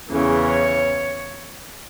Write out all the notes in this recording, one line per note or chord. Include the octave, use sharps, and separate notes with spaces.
E2 C#3 E3
C#5